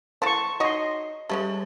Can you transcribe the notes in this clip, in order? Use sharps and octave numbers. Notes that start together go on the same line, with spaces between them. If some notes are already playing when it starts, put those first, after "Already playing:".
E3 A3 C5 A5 C#6
D#4 F#4 C#5 D#5 C6
G3 G#3 C#4 G4 A4 E5